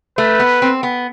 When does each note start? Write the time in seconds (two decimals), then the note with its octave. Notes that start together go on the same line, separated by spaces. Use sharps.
0.18 A3 B4
0.40 B3
0.62 C4
0.83 B3